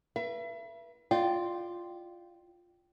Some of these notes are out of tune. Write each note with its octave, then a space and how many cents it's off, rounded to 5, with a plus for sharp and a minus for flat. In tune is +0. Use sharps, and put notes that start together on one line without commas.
B4 -35 E5 +35
F4 +0 D5 +30 G5 -15